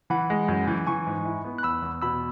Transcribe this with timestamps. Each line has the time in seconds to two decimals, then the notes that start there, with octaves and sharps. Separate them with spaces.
0.10 E3 F#5 B5
0.30 G#3
0.48 F#2
0.67 E3
0.87 E3 G#5 C#6
1.06 G#2
1.25 E4
1.45 B3
1.58 F#6
1.63 E2 B5 E6
1.82 E2
2.02 B2 B5 E6